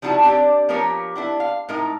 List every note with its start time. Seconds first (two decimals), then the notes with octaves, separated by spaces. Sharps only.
0.02 F3 G3 D#4 E4 F#4 A5
0.23 C4 D4 G4 D5
0.69 F3 A#3 B3 G4 A#4 C#5
1.15 B3 D4 E4
1.40 F5
1.69 A2 G#3 D#4 A#4